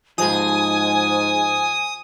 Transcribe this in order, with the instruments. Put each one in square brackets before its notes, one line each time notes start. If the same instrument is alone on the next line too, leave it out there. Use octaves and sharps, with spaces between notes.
[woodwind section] G#2 [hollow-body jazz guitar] F3 G#3 [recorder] G#5 [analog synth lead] D#6